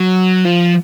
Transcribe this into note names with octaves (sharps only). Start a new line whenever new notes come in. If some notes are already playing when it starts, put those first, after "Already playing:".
Already playing: F#3
F3